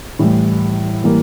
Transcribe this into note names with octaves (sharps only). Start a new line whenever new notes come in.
A2 E3 G3
E3 G3 A#3